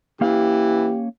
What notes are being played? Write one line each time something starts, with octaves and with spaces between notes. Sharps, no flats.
E3 A#3 C#4 G4 F5